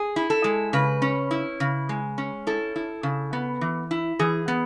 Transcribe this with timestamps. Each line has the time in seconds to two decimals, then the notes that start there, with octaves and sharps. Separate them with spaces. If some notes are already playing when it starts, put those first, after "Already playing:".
Already playing: G#4
0.16 E4
0.30 A4
0.44 G#3
0.73 C#3 B4
1.02 C#4
1.31 E4
1.60 C#3
1.89 G#3
2.18 C#4
2.47 E4 A4
2.76 E4
3.03 C#3
3.33 B3
3.61 E3
3.91 E4
4.19 E3 G#4
4.48 B3